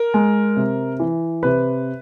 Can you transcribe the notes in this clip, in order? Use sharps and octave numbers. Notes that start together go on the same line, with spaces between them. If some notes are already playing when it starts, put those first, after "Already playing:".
Already playing: A#4
G#3
C3
E3
C3 B4